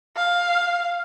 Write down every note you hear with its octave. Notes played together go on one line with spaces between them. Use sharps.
F5